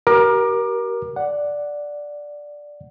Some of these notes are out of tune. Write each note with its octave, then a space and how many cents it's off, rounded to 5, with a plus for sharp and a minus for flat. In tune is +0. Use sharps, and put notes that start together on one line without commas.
G4 -40 A#4 +20 D6 +25
D5 +0 F#5 +0